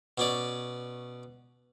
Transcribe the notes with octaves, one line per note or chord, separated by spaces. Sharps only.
B2 C#4 D5